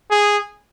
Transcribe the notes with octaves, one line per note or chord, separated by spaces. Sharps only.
G#4